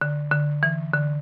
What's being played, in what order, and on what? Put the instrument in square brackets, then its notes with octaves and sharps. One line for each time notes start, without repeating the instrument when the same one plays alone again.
[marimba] D3
D3
E3
D3